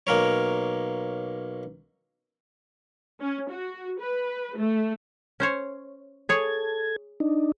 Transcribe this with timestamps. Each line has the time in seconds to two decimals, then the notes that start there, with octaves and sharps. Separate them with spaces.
0.07 B1 A#3 A#4 C#5
3.21 C#4
3.50 F#4
4.00 B4
4.57 A3
5.40 C#4 C5 C#5
6.29 G#4 A4 C#5 G#6
7.20 D4 D#4